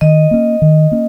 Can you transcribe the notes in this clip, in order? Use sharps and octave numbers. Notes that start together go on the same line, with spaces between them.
D#3 D#5
A#3 C#4
D#3
A#3 C#4